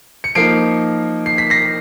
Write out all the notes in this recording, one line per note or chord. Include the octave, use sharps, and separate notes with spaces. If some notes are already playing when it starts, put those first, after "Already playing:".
C#7
F3 A#3 D#4 C7 D7
C7
B6
A#6 C7